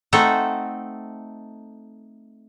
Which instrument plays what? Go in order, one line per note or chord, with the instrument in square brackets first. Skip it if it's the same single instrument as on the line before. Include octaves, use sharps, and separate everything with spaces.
[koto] A3 C4 D#4 A4 F#5